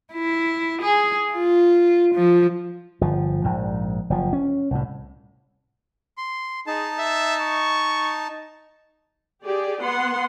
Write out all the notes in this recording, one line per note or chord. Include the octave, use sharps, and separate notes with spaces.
E4
G#4
F4
F3
G1 F3
A#1 G#2
F#1 F3
C#4
C2 A2
C6
D#4 G#4 A5
E5
C#6
G4 G#4 D5
B3 F#5 C6